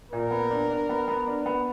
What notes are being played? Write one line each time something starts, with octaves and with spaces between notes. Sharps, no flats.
A#2 A#4
B3
D4
D4
B3
B3
D4
B3